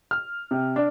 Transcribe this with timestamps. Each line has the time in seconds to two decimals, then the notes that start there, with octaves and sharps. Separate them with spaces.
0.11 F6
0.51 C3
0.76 D4